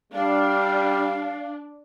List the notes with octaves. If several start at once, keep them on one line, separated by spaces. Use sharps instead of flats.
G3 D4 F5